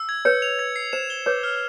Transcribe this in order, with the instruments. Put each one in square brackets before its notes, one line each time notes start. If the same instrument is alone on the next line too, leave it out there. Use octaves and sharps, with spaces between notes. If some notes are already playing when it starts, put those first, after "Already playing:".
Already playing: [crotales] E6
G#6
[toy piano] B4 C#5 [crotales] C#7
[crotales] F7
G#6
C7
[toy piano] C5 [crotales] E7
[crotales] G7
[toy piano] B4 C#5 [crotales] D6
[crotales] F6